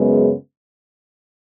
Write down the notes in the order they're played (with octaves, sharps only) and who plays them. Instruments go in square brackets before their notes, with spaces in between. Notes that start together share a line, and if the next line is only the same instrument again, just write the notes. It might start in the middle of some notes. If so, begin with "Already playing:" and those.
Already playing: [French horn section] F#2 C#3 G#3 B3